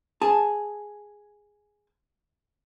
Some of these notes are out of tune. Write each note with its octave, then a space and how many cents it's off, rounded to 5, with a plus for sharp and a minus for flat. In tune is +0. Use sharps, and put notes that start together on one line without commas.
G#4 +0 A5 +0